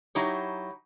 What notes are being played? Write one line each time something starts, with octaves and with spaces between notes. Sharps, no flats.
F#3 D#4 E4 G4 C#5